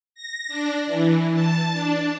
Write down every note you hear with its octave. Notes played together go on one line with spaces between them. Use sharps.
A#6
D4
E3
A5
D4